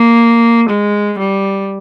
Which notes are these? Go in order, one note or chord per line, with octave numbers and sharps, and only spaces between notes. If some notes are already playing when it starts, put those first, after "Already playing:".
Already playing: A#3
G#3
G3